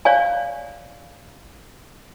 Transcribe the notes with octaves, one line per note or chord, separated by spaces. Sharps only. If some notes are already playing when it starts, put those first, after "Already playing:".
C#5 D5 F5 G#5